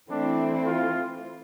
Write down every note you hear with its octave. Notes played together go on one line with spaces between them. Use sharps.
E3 A3 C4 D4 E4
F4